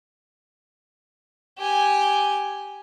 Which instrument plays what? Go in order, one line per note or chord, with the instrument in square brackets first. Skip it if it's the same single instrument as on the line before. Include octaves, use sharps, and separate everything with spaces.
[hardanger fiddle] G4 G#5